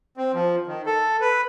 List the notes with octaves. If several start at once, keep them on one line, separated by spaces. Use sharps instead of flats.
C4
F3
D#3
A4
B4